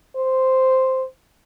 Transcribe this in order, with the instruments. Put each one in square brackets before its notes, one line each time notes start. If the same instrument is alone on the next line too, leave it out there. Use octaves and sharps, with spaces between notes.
[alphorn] C5